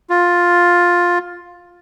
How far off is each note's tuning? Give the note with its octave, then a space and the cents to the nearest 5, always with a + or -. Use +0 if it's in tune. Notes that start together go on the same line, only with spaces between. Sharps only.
F4 +10